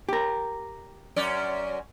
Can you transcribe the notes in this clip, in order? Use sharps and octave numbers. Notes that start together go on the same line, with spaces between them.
G4 A#4
F#2 C#4 D5